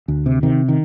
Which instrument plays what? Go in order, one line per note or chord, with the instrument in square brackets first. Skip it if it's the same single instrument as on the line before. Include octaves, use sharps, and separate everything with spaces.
[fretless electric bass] D2
C3
C3 D#3
D#3